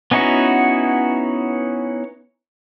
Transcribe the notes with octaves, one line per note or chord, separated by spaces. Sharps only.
B3 C#4 D#4 E4 F#4